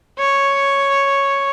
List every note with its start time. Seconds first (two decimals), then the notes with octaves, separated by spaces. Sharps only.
0.19 C#5